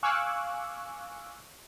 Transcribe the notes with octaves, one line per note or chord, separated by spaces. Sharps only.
F5 G#5 C#6 D6 E6 F#6